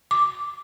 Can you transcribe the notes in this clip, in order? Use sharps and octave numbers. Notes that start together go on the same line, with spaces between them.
D6